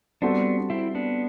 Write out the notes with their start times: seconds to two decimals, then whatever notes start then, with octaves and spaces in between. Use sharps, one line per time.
0.22 G3 B3 C4 D4 F#4 A4
0.70 C4 E4
0.95 B3 D4